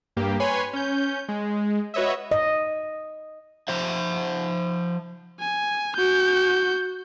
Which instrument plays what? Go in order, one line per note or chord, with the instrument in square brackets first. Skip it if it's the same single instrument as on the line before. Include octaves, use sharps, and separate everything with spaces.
[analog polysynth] G2 A#3 G4
B4 C#5 G#5 B5 C6
C#4 G6
G#3
F#4 B4 C#5 D#5 E5
[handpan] D#5
[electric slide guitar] F3 C5 E5
[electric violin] G#5
F#4 G6